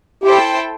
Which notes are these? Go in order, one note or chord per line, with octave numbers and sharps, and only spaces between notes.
E4 G4 A4 C5 G5